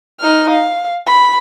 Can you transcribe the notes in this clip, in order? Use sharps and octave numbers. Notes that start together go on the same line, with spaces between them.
D#4 F6
F5
B5